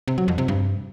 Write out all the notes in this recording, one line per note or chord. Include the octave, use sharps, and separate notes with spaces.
C3
F#3
F2
C3
G2